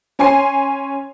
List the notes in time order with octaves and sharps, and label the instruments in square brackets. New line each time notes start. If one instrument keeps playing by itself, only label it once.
[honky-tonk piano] C#4 C#5 G#5 C6 C7